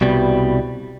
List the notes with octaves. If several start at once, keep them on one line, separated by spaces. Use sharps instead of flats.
C2 B2 G3